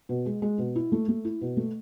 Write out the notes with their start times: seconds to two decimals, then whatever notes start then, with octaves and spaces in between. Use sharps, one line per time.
0.09 B2
0.26 G#3
0.42 G#3
0.58 B2
0.75 E4
0.92 A3
1.08 A3
1.25 E4
1.41 B2
1.57 A3